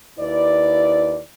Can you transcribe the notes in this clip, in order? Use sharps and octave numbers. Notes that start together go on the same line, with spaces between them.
D#2 E4 B4 D5